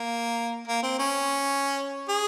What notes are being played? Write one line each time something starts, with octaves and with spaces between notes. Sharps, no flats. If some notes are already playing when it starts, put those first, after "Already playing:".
Already playing: A#3
A#3
C4
C#4
G#4